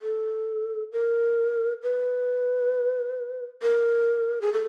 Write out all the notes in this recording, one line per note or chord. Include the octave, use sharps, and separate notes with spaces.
A4
A#4
B4
A#4
G#4
A4